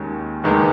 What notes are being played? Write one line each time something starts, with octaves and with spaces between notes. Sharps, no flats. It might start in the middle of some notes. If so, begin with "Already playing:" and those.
Already playing: D#2 D#3 G#3 C#4
F#1 E2 D#3 G#3 B3